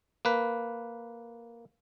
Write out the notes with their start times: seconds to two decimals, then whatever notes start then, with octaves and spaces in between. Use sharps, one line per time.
0.25 A#3 B4